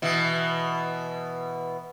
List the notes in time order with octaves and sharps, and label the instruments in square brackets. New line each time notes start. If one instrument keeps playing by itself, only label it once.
[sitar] B2 E3